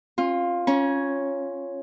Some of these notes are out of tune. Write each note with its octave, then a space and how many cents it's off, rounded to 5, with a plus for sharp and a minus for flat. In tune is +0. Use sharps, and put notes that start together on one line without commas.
C#4 -45 F4 +5
C#4 -5 C#5 +0 A#5 +45